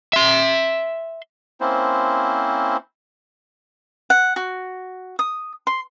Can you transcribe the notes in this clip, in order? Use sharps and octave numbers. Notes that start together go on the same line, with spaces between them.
E5 C6
A#3 C4 C#4 E4 C5
F#5
F#4
D#6
C6